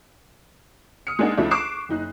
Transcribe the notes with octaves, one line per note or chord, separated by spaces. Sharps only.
D#6 F6 C#7
G#3 A#3 D4 D#4 F#5
C#2 F3 A3 D4 E4
C#6 D6 F#6 C7 E7
F#1 D#4 F#6